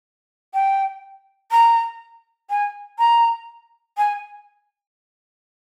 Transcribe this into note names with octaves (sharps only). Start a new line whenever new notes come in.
G5
A#5
G#5
A#5
G#5